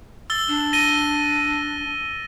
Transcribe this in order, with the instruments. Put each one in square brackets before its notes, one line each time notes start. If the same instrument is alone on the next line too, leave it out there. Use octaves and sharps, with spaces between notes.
[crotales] E6 A6 G7
[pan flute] D4
[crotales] A#6 D#7 G7